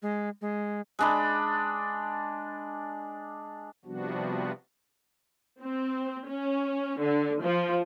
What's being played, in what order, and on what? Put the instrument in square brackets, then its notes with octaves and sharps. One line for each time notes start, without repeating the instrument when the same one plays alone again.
[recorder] G#3
G#3
[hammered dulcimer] G#3 D4 B5
[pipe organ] C3 F3 G3 B3 D4 F#4
[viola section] C4
C#4
D3
F3